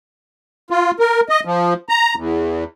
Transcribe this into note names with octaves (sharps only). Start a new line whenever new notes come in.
F4
A#4
D#5
F3
A#5
E2